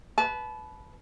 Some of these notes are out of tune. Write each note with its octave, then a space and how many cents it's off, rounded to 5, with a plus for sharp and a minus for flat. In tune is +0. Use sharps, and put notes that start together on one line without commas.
B4 +0 A5 -30